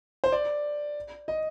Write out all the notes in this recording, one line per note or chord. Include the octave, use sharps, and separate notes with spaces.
C5
D5
D#5